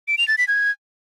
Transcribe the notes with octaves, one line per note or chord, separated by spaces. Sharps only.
D7
F7
A6
B6
G#6